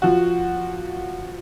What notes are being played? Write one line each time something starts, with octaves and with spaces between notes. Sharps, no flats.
F3 F#4